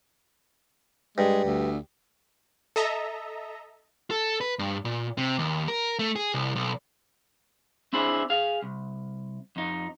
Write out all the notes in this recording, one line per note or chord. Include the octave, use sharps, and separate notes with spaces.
G2 G#3
D2
A4 D#5 E5 A#5
A4
B4
G2
A#2
C3
D#2
A#4
A3
G#4
C2
B1
C4 D4 E4 G#4 C5
G#4 F5
C2
F2 D#4